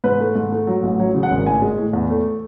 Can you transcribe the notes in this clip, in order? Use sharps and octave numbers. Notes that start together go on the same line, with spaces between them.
G#2 B4
A3
G#2
A3
F#3
A1
F#3 C#5
C#3
F#5
G#1
A2 G#5
G#3
A2
E2
A3